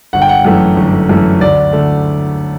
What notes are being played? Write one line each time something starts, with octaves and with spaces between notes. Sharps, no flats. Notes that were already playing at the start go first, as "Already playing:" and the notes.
G1 F#5
G5
F#5
F#2 E3 A3
G1
F#2 E3 A3
D2 D5
D3 A3